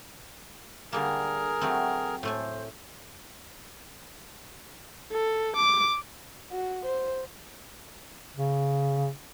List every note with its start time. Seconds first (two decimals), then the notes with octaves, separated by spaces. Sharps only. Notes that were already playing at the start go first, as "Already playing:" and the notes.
0.92 D3 G3 A#3 G#4 A#4
1.61 F#3 A3 C4
2.23 A2 A3 C5 G#5
5.12 A4
5.56 D6
6.52 F#4
6.85 C5
8.36 C#3